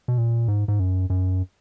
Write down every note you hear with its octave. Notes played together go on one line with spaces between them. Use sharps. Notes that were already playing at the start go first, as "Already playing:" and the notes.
B2
A#2
G#2
G#2
F#2
F#2